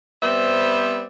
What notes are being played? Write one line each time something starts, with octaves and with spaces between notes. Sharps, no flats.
G3 B3 C4 C5 D5 E5